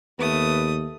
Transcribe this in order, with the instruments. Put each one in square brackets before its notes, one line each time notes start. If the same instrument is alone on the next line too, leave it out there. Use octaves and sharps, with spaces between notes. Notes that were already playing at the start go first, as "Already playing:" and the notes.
[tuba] D#2 [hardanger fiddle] A3 D#6 [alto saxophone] B3